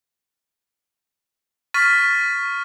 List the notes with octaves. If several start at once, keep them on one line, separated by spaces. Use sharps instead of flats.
C#6 F6 A6 B6 D#7